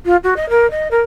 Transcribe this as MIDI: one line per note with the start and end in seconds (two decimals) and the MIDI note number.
0.05 0.16 65
0.23 0.34 66
0.36 0.47 75
0.49 0.69 70
0.70 0.90 75
0.90 1.01 70